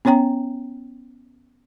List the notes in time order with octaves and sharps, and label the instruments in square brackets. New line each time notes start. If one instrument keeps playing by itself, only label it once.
[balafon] B3 C#4 C#5 G5 A#5